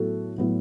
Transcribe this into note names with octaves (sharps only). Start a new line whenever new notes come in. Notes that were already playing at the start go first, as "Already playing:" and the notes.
Already playing: A2 F#3 B3 F#4 A4
A2 F#3 B3